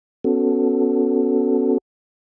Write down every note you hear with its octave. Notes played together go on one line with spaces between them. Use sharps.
B3 C#4 F#4 A4